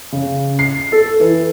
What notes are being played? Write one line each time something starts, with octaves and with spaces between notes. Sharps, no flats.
C#3
C7
A4
E3